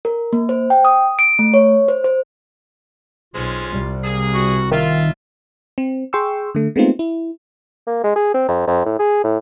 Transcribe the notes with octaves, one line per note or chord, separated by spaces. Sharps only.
A#4
A#3
C5
G5
D#6
D7
A3
C#5
C5
C5
B1 G#3 C4 C#4 F4
C2 C3 G3
A#3 G#4
F#4
D#3 F4 E5
C4
G#4 G5 C6 C#6 E6
D3 A3
G#3 A3 B3 C4 D#4 F4
E4
A#3
G#3
G#4
C4
F2
F2
A2
G#4
A2